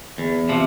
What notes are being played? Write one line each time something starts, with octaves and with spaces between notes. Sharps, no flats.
E2
C3 F3